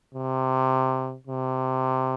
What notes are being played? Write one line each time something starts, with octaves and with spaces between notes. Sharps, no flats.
C3
C3